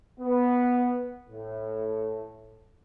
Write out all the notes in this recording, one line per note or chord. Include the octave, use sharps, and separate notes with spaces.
B3
A2